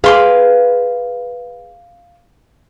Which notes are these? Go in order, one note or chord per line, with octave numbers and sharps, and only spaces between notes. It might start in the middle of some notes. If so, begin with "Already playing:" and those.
G#4 B4 F5 C6 D6